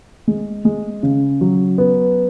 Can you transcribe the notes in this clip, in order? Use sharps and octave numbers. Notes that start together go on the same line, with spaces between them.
G#3
G#3
C#3
F#3
B3